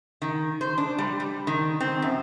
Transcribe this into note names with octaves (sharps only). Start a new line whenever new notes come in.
D#3
C5
D4
G3
G3
D#3
C4
F#2